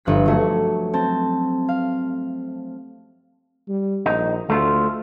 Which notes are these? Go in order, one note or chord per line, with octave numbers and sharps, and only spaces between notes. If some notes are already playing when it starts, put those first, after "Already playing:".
G1 F3 F#6 B6
F#3 A3 F#4
C4 A5
F5
G3
A#1 D#4
D2 A3 F4